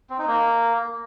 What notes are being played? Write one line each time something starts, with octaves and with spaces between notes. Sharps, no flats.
C4
D#4
A#3